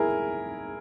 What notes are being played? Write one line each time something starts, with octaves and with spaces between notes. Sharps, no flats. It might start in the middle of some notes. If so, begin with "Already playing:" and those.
Already playing: E4 G#4 A#4